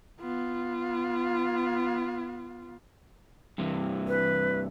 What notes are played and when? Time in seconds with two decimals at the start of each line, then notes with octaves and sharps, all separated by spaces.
0.21 B3 F4
3.58 G2 C3 E3
4.08 B4